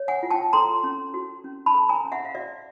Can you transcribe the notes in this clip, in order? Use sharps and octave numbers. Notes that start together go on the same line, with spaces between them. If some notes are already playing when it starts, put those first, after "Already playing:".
Already playing: C#5
F#5 G#5
F4
G5 A5
A4 A#5 C6
C#4
F#4
C#4
A5 B5
A4
G#5 A#5
C#4
E5 F#5
F5
F#4 D5 E5